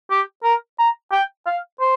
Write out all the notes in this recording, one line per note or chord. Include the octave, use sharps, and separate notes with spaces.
G4
A#4
A#5
G5
F5
C5